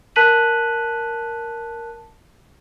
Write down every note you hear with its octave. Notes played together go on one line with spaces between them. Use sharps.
A#4 A5 F#6 B6 D#7 F#7